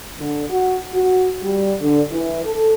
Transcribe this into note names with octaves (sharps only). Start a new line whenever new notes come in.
D3
F#4
F#4
G3
D3
E3
A4